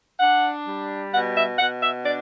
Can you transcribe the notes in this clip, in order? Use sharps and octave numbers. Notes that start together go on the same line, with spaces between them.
D4 F#5
G3
B2 F#5
E5
B2 F#5
E5
D4 D5